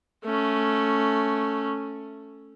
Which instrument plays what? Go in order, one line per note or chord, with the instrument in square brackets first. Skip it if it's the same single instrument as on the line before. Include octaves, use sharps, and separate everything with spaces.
[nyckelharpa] A3 C#4